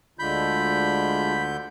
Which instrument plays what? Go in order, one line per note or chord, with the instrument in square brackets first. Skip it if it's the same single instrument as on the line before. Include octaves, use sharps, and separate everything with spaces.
[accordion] D2 D3 G6 [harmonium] G#3 D4 F4 [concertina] B5